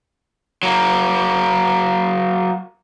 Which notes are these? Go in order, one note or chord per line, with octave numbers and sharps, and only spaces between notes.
F#3 A#3